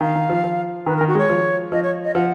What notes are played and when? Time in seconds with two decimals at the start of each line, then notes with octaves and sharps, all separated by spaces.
0.01 D#3 F5
0.15 D#3
0.30 F3
0.44 F3
0.86 D#3 B4
0.97 A#4
1.01 D#3
1.08 F#4
1.15 G#3 C#5
1.29 F3
1.72 F3 D#5
1.83 C#5
2.04 D#5
2.15 F3 F#5